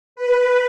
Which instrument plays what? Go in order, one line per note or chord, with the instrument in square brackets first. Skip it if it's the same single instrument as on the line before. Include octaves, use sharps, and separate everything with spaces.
[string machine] B4